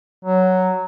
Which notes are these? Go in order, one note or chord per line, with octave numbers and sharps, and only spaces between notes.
F#3